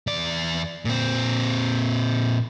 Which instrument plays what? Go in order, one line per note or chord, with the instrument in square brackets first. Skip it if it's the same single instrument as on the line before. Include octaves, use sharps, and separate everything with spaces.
[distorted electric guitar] E2 D5
A#2 C4